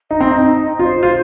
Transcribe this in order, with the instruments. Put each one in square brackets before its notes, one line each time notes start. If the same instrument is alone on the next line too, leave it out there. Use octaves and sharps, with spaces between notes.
[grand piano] D#4 [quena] D#5
[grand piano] C4
D#4
[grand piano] F4 [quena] D#5
[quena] C5
[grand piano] F4